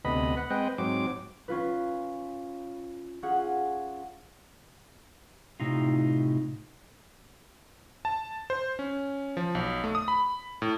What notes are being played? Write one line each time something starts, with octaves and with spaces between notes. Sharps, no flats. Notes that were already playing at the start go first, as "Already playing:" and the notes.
D2 C3 B3 D#5 B5
F#5
G#3 C4 B4 D#5 G5
G#2 F#3 C4 D6
C#4 F4 B4
C#4 F4 G#4 F#5
A2 C3 D#4 F4
A5
C5
C#4
F3
B1
A3
D#6
B5
A2